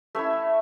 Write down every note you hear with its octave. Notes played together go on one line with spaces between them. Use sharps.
A3 C#4 E4 C#5 E5